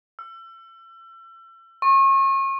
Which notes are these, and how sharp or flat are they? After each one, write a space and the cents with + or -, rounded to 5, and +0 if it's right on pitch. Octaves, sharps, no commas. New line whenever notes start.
E6 +35
C#6 -35